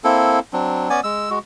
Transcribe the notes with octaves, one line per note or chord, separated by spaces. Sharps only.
A#3 C4 E4 A4
F#3 C4 D4
B3 C#4 D5 G#5
G#3 E6
G#3 F#4